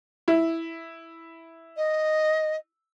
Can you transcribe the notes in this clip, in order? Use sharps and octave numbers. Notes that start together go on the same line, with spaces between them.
E4
D#5